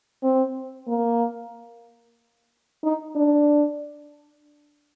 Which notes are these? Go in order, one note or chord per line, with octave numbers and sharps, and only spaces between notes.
C4
A#3
D#4
D4